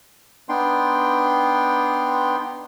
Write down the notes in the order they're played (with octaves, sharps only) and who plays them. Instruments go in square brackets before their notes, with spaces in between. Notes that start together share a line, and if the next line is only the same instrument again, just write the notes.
[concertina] B3 D4 D#4 G5 C6